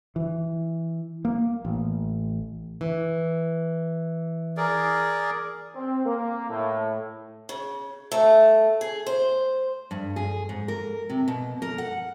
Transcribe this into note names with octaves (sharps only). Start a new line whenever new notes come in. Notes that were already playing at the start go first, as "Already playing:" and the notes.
E3
A#3
A1
E3
G#4 A#4 D5
C4
A#3
A2
C#3
A3
G#4
C5
G2
G#4
G#2
A#4
C3
B2
A#4
F#5